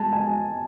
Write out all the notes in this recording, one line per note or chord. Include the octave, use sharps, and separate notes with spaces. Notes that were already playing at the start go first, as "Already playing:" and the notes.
Already playing: G#3 A5
G#5